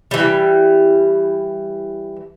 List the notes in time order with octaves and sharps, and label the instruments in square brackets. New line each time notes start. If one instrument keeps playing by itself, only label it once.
[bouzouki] E3 G3